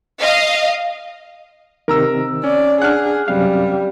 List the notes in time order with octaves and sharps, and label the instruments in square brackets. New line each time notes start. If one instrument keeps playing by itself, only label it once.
[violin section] D#5 F5
[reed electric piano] C3 D#3 [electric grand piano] A#4 A#5 E6
[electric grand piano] C#4 [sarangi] D5
[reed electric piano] D4 F#5 [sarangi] G#4 [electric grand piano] F6 F#6
[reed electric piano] F#2 C3 F5 [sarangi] G3